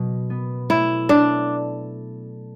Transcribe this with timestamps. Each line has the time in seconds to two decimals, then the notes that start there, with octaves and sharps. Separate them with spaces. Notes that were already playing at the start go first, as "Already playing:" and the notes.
Already playing: B2 F#3
0.30 B3
0.70 A3 E4
1.09 D4 A4